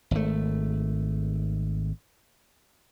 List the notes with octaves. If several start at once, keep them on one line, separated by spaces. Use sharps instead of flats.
G#1 A3